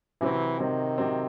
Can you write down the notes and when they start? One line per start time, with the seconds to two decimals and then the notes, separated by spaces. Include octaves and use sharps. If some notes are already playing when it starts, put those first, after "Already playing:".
0.21 C3 E3 F#3 C4
0.59 C3 D#3 F#3 C4
0.98 C3 F#3 C4